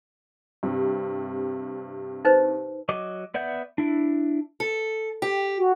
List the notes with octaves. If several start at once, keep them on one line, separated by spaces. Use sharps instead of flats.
G2 C3
D#4 B4 C5
F#3 D#5 D6
B3 D5 E5 F#5 G6
D4 E4
A4
G4
F#4